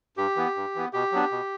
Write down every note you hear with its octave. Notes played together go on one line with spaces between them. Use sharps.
G2 G4
E3 B3
G2
E3 B3
B2 G4
F#3 B3 D4
B2